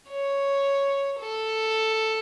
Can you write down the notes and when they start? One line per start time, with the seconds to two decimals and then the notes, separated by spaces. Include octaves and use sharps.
0.09 C#5
1.20 A4